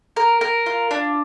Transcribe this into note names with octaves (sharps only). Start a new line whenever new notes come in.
A#4
A#4
F4
D4